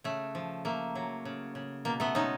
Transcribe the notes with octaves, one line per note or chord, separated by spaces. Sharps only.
C#3 A3
F3
A3 A#3
F#3
C#3
C#3
B2 A#3
A3 B3
G#3 C#4 D#4